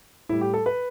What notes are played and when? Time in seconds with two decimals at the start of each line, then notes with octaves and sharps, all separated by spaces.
0.29 A2 G3 E4
0.41 G4
0.54 A4
0.66 B4